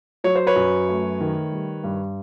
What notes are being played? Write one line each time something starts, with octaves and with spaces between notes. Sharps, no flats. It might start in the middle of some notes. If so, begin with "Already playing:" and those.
F#3 C#5
C5
B4 C#5
F#2
A3
D#3
G3
G2